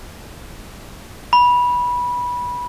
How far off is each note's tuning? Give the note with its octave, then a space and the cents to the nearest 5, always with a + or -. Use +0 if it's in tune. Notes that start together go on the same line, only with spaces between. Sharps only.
B5 -15